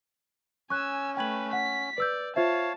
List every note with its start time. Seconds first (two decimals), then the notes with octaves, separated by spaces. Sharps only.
0.70 C#4 G#5 C#6 E6 F#6
1.17 A3 B4 G5 G#6 F#7
1.53 F#5 B6
1.98 B4 D5 E6 G6
2.36 F4 C5 C#5 E5 F5 A5